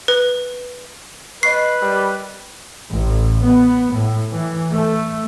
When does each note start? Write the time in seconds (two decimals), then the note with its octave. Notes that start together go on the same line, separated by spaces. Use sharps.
0.08 B4
1.43 B4 C#5 D#5 C#6 C7
1.82 G3 A#4
2.90 A1
3.44 B3
3.93 A2
4.32 E3
4.70 A3